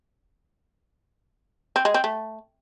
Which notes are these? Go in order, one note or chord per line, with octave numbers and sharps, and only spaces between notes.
C4
G#3
C4
A3